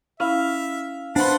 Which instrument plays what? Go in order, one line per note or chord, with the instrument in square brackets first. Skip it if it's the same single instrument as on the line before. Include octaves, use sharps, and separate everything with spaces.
[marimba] C#4 E4 B5 [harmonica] E5 [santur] F5
[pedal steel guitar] D4 C6 [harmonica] B4 F#5 A5 [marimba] C5 B5